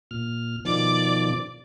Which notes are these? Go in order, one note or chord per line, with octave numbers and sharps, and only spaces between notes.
A#2 F6
B2 D#3 F3 D5 D6